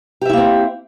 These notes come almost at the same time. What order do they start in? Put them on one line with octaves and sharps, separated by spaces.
G4 E5 E4 A#3 C4